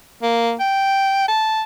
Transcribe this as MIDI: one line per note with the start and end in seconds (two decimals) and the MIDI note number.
0.22 0.54 58
0.60 1.25 79
1.28 1.63 81